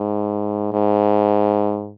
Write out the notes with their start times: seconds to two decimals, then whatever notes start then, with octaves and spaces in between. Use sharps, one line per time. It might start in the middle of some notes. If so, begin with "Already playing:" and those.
Already playing: G#2
0.73 G#2